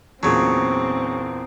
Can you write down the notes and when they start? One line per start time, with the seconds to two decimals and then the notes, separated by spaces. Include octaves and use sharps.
0.23 E2 A#2 C#3 F#3 C4 A5 A#5 D#6